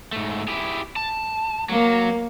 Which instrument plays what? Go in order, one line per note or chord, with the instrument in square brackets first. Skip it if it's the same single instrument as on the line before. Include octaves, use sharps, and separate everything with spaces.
[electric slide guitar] G#2 A3
E4 G4 G#4
A5
[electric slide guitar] F#3 [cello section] A#3